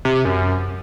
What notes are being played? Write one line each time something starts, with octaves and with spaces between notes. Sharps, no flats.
C3
C3
F#2